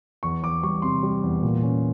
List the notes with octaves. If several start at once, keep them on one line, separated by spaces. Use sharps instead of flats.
E2 C#6
E2 D6
G3 C#6
C3 C6
G3
E2
A#2
C#4